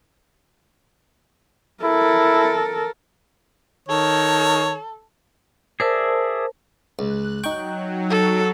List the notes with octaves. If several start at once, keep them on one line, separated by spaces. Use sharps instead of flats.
E4 A4 A#4
D#3 A4 C#5
G#4 A#4 C5 D5 E5 A5
C#2 F#6
F#3 D#4 G5 C#6
A4